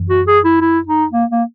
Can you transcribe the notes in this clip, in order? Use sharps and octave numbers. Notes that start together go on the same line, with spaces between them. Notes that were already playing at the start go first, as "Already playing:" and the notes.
Already playing: F#2 E3
F#4
G#4
E4
E4
D#4
A#3
A#3